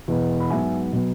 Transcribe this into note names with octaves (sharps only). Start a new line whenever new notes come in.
E2 B2 B3
B5
G#2 F#3 B3 E5 G#5
B2 F#3 B3